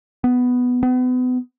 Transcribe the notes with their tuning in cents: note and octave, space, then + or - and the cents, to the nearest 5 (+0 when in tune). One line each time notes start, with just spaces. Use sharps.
B3 +5
B3 +35